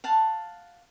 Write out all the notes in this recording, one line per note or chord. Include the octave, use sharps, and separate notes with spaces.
F5 F#5 A5